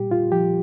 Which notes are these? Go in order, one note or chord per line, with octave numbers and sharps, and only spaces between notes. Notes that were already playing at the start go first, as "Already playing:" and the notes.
Already playing: A#2 G3 G4
F4
F3 G4